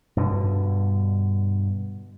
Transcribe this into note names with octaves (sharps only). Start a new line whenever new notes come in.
G2 B2 D3